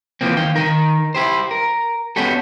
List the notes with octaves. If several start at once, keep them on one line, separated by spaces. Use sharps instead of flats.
D#2 E3 F3 A#3 C4
D#3 F5 G5
D#3 A#4
E4 G4 C5
A#4
B3 C#4 F#4 G4 A4